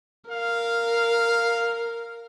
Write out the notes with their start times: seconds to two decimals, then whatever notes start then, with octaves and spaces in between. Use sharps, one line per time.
0.31 A#4 F5